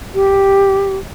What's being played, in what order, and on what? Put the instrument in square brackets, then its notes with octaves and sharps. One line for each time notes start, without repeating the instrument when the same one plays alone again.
[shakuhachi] G4